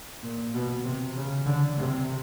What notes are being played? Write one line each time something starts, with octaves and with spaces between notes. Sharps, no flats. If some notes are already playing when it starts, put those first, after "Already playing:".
A#2
B2
C3
C#3
D3
C3